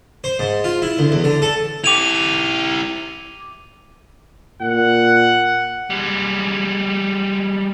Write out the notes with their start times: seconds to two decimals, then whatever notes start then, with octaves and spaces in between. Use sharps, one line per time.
0.24 C5
0.39 G#2
0.64 F4
0.82 E4
0.99 D2
1.12 E2
1.24 D3
1.42 A4
1.84 E4 G4 D6 D#7 F7
4.61 A#2 F#5
5.90 G3 G#3